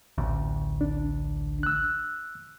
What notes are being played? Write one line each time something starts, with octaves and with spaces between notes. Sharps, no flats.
A1 D2
D4
E6 F#6